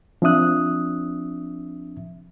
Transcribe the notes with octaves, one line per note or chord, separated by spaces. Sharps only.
F3 C4 D4 E5 D#6 F#6